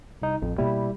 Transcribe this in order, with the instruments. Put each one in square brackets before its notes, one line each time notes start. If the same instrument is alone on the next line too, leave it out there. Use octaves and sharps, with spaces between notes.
[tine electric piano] C2 D#4
[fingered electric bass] A1 [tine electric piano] F2
[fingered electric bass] B2 A#3 [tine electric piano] G3 E4